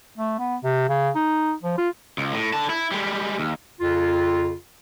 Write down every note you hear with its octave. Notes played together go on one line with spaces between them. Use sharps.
A3
B3
C3
C#3
D#4
F3
F4
C#2
A2
D3 A5
E4
G3 G#3
D#2
F2 C#3 F4